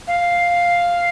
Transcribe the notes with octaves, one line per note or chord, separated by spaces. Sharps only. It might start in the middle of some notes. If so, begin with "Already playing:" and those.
F5